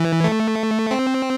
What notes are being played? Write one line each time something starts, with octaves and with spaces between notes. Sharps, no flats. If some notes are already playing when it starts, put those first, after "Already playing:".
Already playing: E3
A3
C4